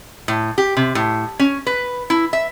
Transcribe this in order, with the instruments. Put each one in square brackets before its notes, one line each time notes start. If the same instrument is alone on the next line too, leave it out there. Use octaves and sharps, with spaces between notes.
[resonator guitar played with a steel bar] A2
G4
C3
A2
C#4
B4
E4
E5